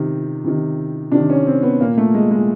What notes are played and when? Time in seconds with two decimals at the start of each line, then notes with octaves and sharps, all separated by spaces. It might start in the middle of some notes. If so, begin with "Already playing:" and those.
Already playing: C3 D#3
0.44 C3 D#3
1.12 C3 D#3 D4
1.30 C#4
1.46 C4
1.63 B3
1.81 A#2 A#3
1.98 A3
2.14 G#3
2.31 G#3